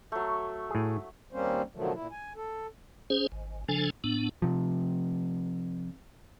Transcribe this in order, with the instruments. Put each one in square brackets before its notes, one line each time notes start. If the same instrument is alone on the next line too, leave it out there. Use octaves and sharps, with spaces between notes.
[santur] F#3 A3
[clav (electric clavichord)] A2 G#4
[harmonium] D#2 G3 A#3 C4 C#4 C5
B2 D3 D#3 F3 F#3 A3
A#2 E4
G#5
A4
[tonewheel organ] C#4 G#4 C5
G#1
C#3 F3 D4 A4 G#5
A2 B3 D4
[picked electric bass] C3 F3